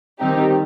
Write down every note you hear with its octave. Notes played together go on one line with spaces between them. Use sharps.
D#3 G3 C4 D#4 G4